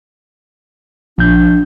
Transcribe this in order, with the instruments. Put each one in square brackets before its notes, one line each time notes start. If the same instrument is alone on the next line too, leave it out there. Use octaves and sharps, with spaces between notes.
[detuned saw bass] A#1 [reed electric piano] F3 G6 [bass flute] D4